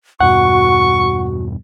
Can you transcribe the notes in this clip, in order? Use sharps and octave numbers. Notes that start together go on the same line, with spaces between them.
E2 G2 B2 F#4 F#5 C#6